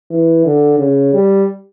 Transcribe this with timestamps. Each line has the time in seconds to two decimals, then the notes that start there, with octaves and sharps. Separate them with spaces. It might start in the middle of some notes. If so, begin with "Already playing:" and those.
0.11 E3
0.45 D3
0.79 C#3
1.14 G3